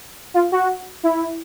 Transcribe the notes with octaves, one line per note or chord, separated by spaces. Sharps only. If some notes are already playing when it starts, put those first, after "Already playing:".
F4
F#4
E4